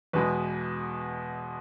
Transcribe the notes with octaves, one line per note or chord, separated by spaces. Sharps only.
E2 B2 G#3 B4